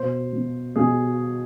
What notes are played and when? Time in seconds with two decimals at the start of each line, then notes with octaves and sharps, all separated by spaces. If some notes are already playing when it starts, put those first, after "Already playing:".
Already playing: B2 C5
0.33 B2
0.76 B2 G#4